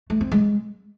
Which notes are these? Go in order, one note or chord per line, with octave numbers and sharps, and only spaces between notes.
A3
C4
G#3